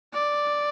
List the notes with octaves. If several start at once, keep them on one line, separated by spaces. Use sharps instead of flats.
D5